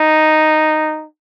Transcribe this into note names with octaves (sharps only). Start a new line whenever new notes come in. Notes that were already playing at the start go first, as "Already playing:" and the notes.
Already playing: D#4